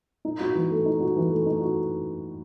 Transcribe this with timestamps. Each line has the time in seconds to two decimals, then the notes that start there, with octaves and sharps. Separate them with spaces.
0.25 D#4
0.40 F#4
0.55 E3
0.70 A3
0.86 D#4
1.00 F#4
1.16 E3
1.31 A3
1.46 D#4
1.61 F#4